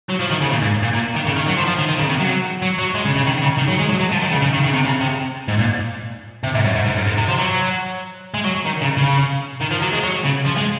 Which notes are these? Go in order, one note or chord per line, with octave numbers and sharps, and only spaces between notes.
F#3
F3
D#3
C#3
A#2
G#2
A#2
A#2
D#3
C#3
D#3
F#3
F3
F3
D#3
D#3
C#3
C3
F#3
F#3
F#3
G#3
C#3
C#3
D#3
C#3
D#3
F#3
G#3
F#3
F#3
F3
D#3
C#3
C#3
D#3
C#3
C3
C#3
C3
G#2
A#2
C3
G#2
F#2
G#2
G#2
F#2
G#2
C3
F3
F#3
G#3
F#3
D#3
C#3
C#3
D#3
F3
F#3
G#3
F#3
C#3
F3
G#3